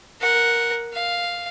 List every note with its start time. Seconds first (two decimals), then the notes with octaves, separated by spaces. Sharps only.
0.21 A#4 F#5
0.94 F5